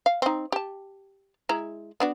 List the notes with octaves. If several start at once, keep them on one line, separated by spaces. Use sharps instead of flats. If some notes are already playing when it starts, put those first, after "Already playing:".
F5
C4 D#4
G4 A5
G#3 E4 A#5
B3 D4 F#4